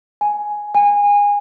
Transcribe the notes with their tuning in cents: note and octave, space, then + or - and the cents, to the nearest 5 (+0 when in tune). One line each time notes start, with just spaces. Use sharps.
G#5 +0
G#5 -25